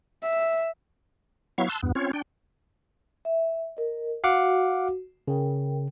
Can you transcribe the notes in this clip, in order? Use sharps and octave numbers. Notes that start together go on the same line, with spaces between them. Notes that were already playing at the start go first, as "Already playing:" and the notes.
E5
F#3 B3 E4 F5 C#6
A5 C6 E6 F#6
E2 G2 B3
C4 C#4 F4 C#5
D4 G5
E5
A#4 D#5
F#4 F5 F#5 D6
C#3 A#4 G5